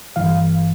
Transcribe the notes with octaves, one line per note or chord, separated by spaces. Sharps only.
G1 G2 E3 F5